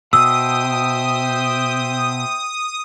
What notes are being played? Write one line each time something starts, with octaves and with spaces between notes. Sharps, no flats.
B2 C5 E5 G5 D#6 E6